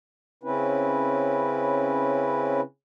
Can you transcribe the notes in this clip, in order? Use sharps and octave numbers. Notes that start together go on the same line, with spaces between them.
C#3 C4 C#4 E4 B4